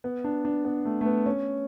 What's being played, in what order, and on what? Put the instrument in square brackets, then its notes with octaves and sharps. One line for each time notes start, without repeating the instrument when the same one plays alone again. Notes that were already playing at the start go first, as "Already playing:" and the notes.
[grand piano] B3
D4
D4
B3
A3
A3
B3
C#4